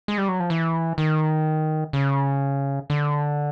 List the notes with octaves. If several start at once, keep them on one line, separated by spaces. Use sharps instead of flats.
G#3
G3
F#3
F3
E3
D#3
C#3
D3